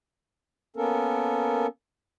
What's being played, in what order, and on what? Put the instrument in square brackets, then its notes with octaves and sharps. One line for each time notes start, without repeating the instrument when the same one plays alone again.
[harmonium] A#3 B3 C#4 A4 A#4